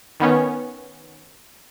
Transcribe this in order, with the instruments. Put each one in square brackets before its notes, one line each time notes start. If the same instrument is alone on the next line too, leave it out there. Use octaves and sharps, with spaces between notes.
[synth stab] D#3 B3 C#4